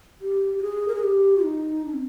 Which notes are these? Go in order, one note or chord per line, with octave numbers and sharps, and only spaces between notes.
G4
G4
G#4
A#4
G#4
G4
D#4
D4
C4